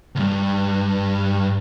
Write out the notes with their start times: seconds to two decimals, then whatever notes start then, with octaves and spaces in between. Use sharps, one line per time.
0.15 D2 G2